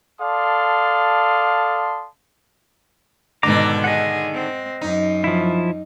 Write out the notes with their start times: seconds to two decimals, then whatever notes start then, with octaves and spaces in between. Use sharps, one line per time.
0.20 A4 D5 F5 A5 C6 D#6
3.43 G#2 B2 D3 D#3 A#5 D6
3.84 G#4 D#5 F#5
4.34 C4
4.81 F#2 D#4
5.24 F3 E4